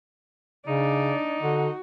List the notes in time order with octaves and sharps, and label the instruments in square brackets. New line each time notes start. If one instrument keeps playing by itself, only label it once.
[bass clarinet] C#3 [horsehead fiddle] D4 D5 [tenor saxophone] D#4
[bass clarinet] D3 [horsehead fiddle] F#4